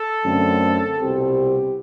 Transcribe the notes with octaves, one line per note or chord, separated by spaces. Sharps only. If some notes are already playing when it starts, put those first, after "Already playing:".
Already playing: A4
F#2 D3 A3 C4
C2 B2 G3 C4 G4